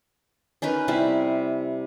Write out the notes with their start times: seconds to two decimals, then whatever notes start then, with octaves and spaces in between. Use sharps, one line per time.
0.62 C#4 D#4 A#4 B4
0.88 C3 G3 E4